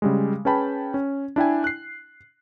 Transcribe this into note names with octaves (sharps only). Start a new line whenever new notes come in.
C#3 G3 G#3
C#4 G#4 B4 G5 A5 B5
C#4
D4 E4 G5 G#5
F#6 C7